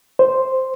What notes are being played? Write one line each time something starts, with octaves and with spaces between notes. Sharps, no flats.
C5